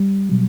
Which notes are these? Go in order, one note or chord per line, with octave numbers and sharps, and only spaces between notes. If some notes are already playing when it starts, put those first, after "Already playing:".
Already playing: G3
B2 F#3